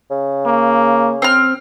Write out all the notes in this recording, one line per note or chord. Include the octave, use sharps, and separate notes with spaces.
C#3
A#3
C4 F6